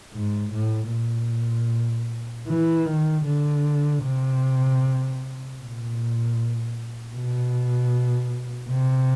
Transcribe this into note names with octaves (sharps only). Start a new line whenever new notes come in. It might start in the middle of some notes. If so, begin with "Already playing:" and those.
G#2
A2
A#2
E3
D#3
D3
C3
A#2
B2
C3